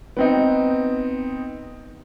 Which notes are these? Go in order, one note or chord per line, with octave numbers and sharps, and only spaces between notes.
B3 C4 D#4